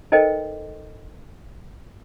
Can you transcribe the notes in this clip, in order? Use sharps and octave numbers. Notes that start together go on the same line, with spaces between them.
D#4 A4 A#4 C5 D#5 G5